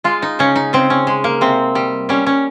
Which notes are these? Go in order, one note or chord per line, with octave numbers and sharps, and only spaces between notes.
G#3 F4
D#4
C#3 C#4
D#4
C#3 C4
C#4
G#3
A#3
C3 C4
G3
G3 C#4
C#4